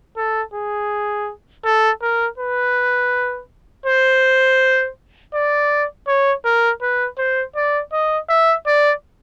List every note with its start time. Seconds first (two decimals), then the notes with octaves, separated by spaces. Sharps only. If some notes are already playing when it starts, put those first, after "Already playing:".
0.16 A4
0.53 G#4
1.64 A4
2.01 A#4
2.38 B4
3.86 C5
5.33 D5
6.07 C#5
6.45 A#4
6.81 B4
7.18 C5
7.55 D5
7.92 D#5
8.29 E5
8.66 D5